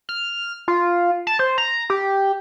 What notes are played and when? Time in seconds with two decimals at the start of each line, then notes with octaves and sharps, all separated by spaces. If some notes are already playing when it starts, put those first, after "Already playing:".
0.09 F6
0.68 F4
1.27 A5
1.39 C5
1.58 A#5
1.90 G4